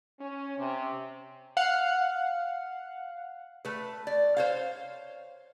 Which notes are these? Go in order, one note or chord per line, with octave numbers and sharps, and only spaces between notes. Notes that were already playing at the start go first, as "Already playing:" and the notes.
C#4
C3
F5 F#5
A3 B4
D5
C5 C#5 F5